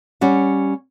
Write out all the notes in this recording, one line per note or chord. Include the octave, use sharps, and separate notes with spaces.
G3 C#4 F#5